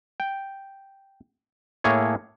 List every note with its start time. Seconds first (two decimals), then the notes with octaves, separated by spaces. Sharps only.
0.20 G5
1.84 A2 A3 A#3 G#4 C#5